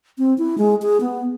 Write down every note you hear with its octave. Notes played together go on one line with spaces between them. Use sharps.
C4
E4
G#3
G#4
B3